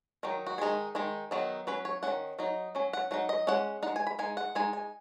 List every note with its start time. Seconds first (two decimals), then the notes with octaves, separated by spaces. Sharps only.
0.23 D#3 F#3 D#4
0.47 F#4
0.58 D#3 G#3 D#4 G#4
0.95 D#3 G#3 D#4
1.31 D#3 F#3 B3 D#4
1.67 F#3 C#4 B4
1.85 C#5
2.03 F#3 C#4 F#5
2.07 D#3
2.39 F#3 D#4
2.75 F#3 C#4
2.93 F#5
3.11 F#3 D#4 F#5
3.29 D#5
3.47 G#3 C#4 F#5
3.83 G#3 D#4 F#5
3.96 G#5
4.07 B5
4.19 G#3 D#4 G#5
4.37 F#5
4.55 G#3 D#4 G#5
4.73 G#5